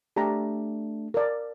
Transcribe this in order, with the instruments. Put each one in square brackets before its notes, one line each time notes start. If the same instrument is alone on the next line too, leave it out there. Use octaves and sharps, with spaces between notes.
[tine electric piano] A3 D4 [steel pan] G4 A#5
[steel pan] A#4 D5